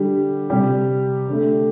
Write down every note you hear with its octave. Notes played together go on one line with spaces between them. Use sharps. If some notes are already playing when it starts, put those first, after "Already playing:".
Already playing: D3 G3 G4
C3 G3 G4
D3 A3